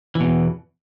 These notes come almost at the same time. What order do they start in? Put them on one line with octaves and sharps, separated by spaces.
E3 B2 E2